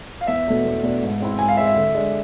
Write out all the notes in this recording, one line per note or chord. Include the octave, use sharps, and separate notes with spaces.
F5
E2 E5
B2 A3 D4
E2
B2 A3 D4
G#2
G#3 C4 E4
G#2 G#5
F5
G#3 C4 E4 E5
E5
D3
G#3 D4